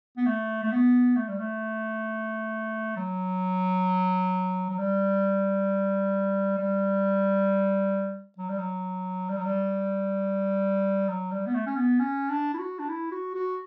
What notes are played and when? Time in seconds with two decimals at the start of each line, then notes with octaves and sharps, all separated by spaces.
0.17 B3
0.26 A3
0.63 A3
0.72 B3
1.16 A3
1.28 G3
1.39 A3
2.97 F#3
4.69 F#3
4.78 G3
6.58 G3
8.38 F#3
8.49 G3
8.59 F#3
9.29 G3
9.37 F#3
9.45 G3
11.08 F#3
11.32 G3
11.46 B3
11.54 A3
11.66 C#4
11.77 B3
12.00 C#4
12.30 D4
12.54 E4
12.59 F#4
12.79 D4
12.89 E4
13.11 F#4
13.34 F#4